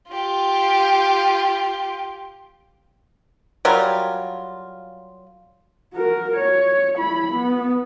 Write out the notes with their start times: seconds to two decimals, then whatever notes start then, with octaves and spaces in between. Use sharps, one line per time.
0.11 F4 G4
3.65 F#3 G3 F4 A#4
5.94 F#4 A#4
6.36 C#5
6.97 E4 B5
7.34 B3